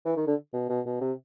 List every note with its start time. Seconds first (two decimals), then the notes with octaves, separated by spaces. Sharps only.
0.05 E3
0.17 D#3
0.27 D3
0.53 B2
0.69 B2
0.86 B2
1.01 C3